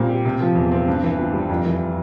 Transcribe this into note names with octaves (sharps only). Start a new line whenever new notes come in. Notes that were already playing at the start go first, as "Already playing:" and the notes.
Already playing: A#2 G3 C4
G4
C3
F3
E2
C4
G2
E3
G1
G3
F2
E3